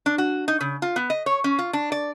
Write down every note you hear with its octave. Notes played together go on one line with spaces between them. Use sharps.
D4
F#4
D#4
C#3
F4
B3
D#5
C#5
C#4
F4
D4
D5